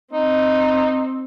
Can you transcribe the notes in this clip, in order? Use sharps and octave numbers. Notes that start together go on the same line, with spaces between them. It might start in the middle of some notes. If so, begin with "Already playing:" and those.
C4 D#4